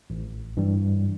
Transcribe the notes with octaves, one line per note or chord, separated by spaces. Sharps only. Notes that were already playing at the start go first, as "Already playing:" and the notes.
A1
G2 E3 G3